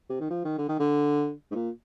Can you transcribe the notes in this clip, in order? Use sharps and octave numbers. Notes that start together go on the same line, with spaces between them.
C3
D#3
F3
D#3
D3
D#3
D3
G#2
A#2